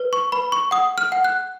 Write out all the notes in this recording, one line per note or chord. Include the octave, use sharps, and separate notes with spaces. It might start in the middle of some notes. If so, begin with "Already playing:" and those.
Already playing: B4
C#6
B4 B5
C#6
F#5 D#6
F6
F#5
F#6